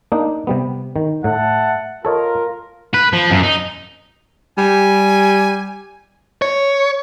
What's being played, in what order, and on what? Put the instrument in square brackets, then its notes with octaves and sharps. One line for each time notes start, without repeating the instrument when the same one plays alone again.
[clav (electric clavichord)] A#3 D4 D#4
C3 G3 B3
D#3
[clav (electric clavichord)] A2 [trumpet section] E5 F#5 A5
[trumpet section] F4 A#4 [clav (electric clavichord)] A4 C#5 D#5
[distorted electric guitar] B4
F3
F#2
D#4
[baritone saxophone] G3 [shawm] G#5
[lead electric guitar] C#5